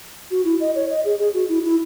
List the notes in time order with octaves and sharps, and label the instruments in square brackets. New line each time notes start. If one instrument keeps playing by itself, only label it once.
[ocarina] F#4
E4
D#5
C#5
D#5
G#4
G#4
F#4
E4
E4